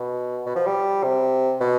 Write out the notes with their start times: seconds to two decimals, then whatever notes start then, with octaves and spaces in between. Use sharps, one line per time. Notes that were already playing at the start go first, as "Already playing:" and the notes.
Already playing: B2
0.46 B2
0.55 F3
0.66 G3
1.03 C3
1.60 B2